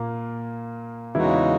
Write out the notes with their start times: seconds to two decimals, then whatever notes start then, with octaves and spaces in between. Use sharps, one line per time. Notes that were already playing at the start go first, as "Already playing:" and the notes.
Already playing: A#2 A#3
1.15 E2 C#3 E3 G#3 D#4 E4 F#4